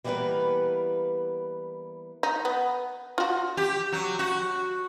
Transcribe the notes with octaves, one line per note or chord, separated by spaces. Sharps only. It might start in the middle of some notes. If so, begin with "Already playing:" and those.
E3 G3 A#3 B3 A#4 B4
D#4
B3
F4 F#4
G4
F#3
F#4